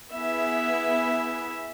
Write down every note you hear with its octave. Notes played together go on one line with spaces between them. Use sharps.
B3 E4 G#4 E5